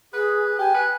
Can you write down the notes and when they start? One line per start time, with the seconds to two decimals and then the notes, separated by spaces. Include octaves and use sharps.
0.13 G#4 B4
0.59 G4 G#5
0.74 B4